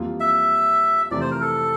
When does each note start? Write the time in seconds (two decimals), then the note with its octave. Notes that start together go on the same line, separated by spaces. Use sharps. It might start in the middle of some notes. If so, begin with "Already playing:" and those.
Already playing: F2 E3 G3 A#3 F4
0.20 E5
1.11 F2 C3 E3 A3 D5
1.21 C5
1.31 A#4
1.41 A4